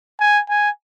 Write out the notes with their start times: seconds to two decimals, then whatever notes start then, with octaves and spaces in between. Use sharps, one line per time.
0.20 G#5
0.49 G#5